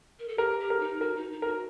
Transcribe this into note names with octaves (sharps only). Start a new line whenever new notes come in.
A#4
A4
G4 A#4
G4
A#4
D#4
F#4 A#4
D#4
D#4
F#4 A#4